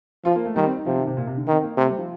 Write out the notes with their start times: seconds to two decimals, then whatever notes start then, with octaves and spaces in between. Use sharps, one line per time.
0.25 F3 F4
0.35 A#3
0.46 A3
0.55 D#3 G3
0.66 C4
0.76 D#4
0.86 C3 F3
0.97 D#3
1.07 C3
1.17 A#2
1.27 C3
1.37 D3
1.48 D#3 C4
1.63 A#3
1.78 C3 A3
1.89 G3
1.98 F3